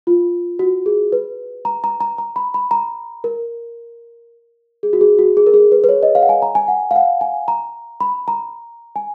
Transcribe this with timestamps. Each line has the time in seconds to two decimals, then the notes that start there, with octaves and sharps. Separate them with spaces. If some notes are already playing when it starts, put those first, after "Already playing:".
0.07 F4
0.59 F#4
0.86 G#4
1.12 B4
1.65 A#5
1.84 A#5
2.01 A#5
2.18 A#5
2.36 B5
2.54 B5
2.71 A#5
3.24 A#4
4.83 G#4
4.93 F#4
5.01 G#4
5.19 F#4
5.37 G#4
5.47 A#4
5.54 G#4
5.72 B4
5.84 B4
5.89 C#5
6.03 D#5
6.15 F5
6.22 F#5
6.29 G#5
6.42 A#5
6.55 G#5
6.68 F#5
6.91 F5
6.96 F#5
7.21 G#5
7.48 A#5
8.01 B5
8.28 A#5
8.96 G#5